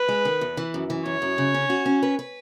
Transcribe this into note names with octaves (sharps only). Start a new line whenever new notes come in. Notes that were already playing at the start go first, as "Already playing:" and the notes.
Already playing: B4
G#3
D#3
E2
E3
F#2
E3
F#2 C#5
F#2
C#3
C#4
F#4
C#4
B4
B4